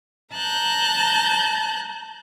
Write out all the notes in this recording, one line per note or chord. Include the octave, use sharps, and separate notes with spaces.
A5 A#5 F#6 G6